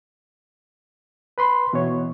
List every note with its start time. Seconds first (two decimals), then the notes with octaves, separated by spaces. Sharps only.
1.38 B4 B5 C6
1.73 B2 E3 C#5